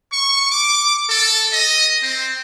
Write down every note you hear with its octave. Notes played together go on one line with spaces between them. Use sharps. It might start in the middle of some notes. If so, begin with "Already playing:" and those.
C#6
D6
A4
D#5
C4